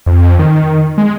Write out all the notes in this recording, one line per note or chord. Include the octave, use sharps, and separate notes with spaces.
F2
D#3
G#3